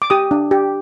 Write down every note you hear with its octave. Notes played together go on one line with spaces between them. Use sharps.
D6
G4 D#6
D4
G4